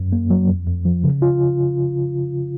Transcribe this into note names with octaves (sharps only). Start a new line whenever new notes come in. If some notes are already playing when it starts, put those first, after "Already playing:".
Already playing: F#2
A#3
F#3
F2
F2
F3
C#3
F4